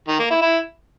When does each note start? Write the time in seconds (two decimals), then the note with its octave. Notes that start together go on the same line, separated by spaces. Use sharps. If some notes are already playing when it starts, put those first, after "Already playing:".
0.08 D#3
0.19 A#3
0.30 E4
0.42 E4